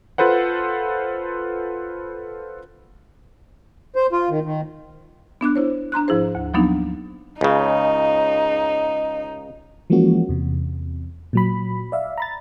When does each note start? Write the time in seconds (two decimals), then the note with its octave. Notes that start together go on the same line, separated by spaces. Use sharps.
0.18 F4 A4 B4 C5 F#5
3.96 C5
4.12 F4
4.30 D#3
4.44 D#3
5.41 B3 D4 D6 F#6
5.56 E4 C5 C#5
5.92 D4 A#5 C6 F#6
6.08 G#2 F3 E4 G#4 C5
6.35 D2
6.54 F3 F#3 A#3 B3 D4 D#4
7.41 C#2 C#3 D#4
9.90 E3 F3 G#3 A#3 C#4 F#4
10.29 E2 C3
11.33 A#2 F#3 B5
11.92 D5 E5 F5
12.18 A#5 B5 A6